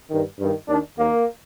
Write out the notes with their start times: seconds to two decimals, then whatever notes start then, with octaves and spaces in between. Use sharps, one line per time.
0.10 G2 D#3
0.39 G2 D#3
0.68 D#2 D#3 D4
0.98 D#2 D#3 A#3